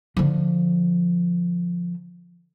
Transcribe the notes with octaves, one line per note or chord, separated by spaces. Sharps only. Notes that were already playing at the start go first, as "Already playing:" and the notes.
D3 F3